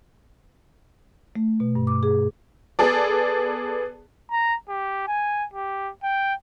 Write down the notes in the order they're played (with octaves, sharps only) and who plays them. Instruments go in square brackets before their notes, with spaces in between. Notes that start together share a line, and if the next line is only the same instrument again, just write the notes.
[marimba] A3
B2
G2
D6
G#4
[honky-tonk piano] B3 G#4 A4 D5
[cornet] A#5
G4
G#5
G4
G5